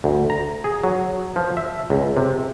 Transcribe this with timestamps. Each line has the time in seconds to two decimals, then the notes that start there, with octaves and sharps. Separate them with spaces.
0.04 D2
0.30 A#5
0.64 G#4
0.84 F#3
1.36 F3
1.57 E5
1.90 C#2
2.17 C3